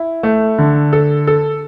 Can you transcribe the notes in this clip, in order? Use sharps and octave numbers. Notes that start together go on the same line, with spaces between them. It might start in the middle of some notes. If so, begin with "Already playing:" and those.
Already playing: E4
A3
D3
A4
A4